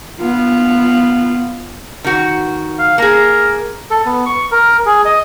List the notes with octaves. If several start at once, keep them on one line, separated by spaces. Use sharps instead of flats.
B3 F4
D#3 F#4
F5
A#3 G#4 A#4
A4
B3
C#6
A#4
G#4
D#5